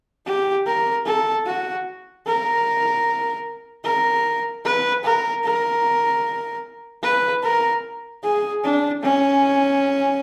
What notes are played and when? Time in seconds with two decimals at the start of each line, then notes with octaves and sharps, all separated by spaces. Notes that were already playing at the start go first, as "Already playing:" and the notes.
0.26 G4
0.66 A#4
1.06 A4
1.45 F#4
2.26 A#4
3.84 A#4
4.65 B4
5.04 A#4
5.44 A#4
7.03 B4
7.43 A#4
8.23 G#4
8.63 D4
9.02 C#4